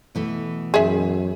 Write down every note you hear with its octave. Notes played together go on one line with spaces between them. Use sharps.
B2 E3 A3
F#2 G#4 E5